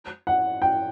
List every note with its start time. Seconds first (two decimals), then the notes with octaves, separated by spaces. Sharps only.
0.27 F#5
0.62 G5